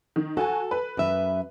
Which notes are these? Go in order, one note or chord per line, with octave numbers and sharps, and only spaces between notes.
D#3
F#4 A4 G#5 A5
B4
F#2 E5